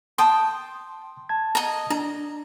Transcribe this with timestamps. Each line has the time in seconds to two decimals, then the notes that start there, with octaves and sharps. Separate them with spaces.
0.18 G5 A5 C6 D#6
1.29 A5 G#6
1.55 D#5 A#5
1.90 D4 A#5